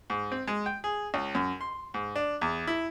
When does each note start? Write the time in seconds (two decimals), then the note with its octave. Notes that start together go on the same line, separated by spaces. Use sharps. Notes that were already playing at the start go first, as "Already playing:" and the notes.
0.10 G#2
0.32 C4
0.48 G#3
0.66 G5
0.84 G#4
1.14 C#2
1.35 F#2
1.61 C6
1.94 G#2
2.16 D4
2.41 E2
2.67 E4